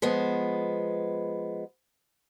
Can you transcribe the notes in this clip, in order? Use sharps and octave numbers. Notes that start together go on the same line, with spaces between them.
F3 G#3 B3